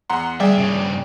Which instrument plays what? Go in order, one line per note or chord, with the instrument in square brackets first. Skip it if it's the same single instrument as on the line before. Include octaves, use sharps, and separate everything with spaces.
[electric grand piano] E2 F#5 C6 [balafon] A#5
[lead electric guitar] D2 E5 [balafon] G3 [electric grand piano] G#4 D5 G5
[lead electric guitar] G2 C#3